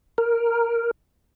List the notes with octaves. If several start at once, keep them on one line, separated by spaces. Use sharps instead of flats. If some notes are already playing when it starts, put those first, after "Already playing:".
A#4